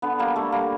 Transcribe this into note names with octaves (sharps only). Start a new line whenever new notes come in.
D3 B3
G3 A#3
G3 A3
G3 A#3